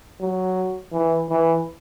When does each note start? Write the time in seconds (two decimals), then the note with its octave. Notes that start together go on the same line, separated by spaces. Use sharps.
0.21 F#3
0.93 E3
1.30 E3